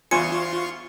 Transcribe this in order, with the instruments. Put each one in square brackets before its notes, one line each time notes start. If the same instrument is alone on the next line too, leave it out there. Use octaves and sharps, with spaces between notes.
[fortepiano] E2 C5 G#5 [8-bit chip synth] F4 C6 C#6 [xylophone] C#7